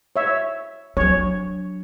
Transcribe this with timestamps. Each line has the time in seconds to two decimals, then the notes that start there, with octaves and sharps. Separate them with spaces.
0.16 C#5 E5
0.97 F#3 D4 C#5